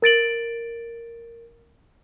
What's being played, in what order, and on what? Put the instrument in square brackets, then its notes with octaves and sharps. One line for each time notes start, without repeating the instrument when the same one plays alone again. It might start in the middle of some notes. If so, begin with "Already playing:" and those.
[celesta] A#4 A6 D7 F#7